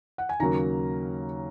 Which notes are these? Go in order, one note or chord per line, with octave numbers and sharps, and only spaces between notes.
F#5
G#5
D#2 C#3 F#3 A#3 A#5